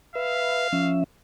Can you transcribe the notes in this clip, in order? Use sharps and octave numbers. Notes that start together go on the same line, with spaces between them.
B4 E5 F5
F3 C#4 E5